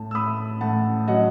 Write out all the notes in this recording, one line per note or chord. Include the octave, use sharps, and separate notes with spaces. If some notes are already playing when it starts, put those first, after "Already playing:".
Already playing: A2 A5
E6
A2 B5 D#6
A2 F#5 A5
F#3 D#5 F#5